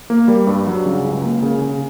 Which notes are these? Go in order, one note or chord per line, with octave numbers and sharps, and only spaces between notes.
A#3
G3
G2
F#3
C#3
C#2
A#3
C#3
C#3